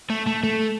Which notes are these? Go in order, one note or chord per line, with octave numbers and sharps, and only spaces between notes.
A3
A3
A3